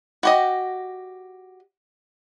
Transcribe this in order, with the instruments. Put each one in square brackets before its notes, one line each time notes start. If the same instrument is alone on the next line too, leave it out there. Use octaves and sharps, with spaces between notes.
[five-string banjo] F#4 G4 D#5